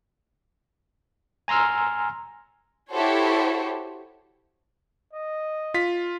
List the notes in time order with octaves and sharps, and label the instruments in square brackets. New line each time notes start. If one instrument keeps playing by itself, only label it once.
[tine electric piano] G#5 A#5 C6 E6 F6
[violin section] E4 F#4 G4 A4 C5 C#5
[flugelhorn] D#5
[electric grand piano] F4 B6